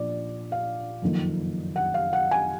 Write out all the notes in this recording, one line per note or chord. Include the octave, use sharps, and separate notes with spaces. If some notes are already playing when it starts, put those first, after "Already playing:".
Already playing: A#2 F3 D4 D5
F5
F#1 F2 D#3 A#3 D#4
F#5
F5
F#5
G#5